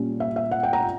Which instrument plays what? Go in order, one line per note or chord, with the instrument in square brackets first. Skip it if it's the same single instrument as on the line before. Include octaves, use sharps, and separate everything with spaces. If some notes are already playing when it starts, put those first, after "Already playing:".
Already playing: [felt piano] A#2 G3 C#4
E5
E5
F#5
G5
A#5